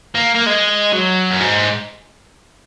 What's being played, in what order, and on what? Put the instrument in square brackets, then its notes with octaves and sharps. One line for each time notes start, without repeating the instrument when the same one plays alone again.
[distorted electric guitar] A#3
A#3
G#3
F#3
F#2
G#2